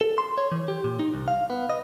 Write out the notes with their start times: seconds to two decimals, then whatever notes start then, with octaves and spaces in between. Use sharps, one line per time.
0.01 A4
0.18 C6
0.38 C#5
0.52 E3
0.68 G4
0.84 A#2
0.99 D#4
1.14 C2
1.28 F5
1.50 B3
1.70 D#5